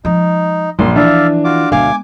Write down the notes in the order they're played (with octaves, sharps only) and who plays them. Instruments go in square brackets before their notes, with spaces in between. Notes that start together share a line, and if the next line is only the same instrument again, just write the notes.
[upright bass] F3 G#3 [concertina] D#4
[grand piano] A#1 [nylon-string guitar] F#2 [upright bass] F3 [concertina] C6
[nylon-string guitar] E3 [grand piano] D4 [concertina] D5 E5 F5
[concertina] F4 F#4 D6
[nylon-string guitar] D2 B2 F5 [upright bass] G#3 B3 [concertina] G#5 D6